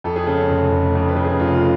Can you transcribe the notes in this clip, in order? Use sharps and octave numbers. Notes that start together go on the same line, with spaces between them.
F2 A4
G#4
C#3 A4
C#5
F1
F1
F2
B4
C#3
G#4
F1 F4
F4